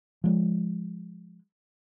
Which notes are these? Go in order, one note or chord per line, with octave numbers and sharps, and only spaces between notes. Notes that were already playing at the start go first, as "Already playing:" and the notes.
F3 G#3